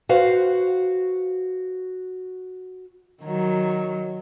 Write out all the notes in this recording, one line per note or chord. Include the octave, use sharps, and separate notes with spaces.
F#4 B4 C5 F5
D#3 F#3